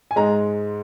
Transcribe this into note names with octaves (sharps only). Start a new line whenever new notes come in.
G#5
G#2 G#3 A#5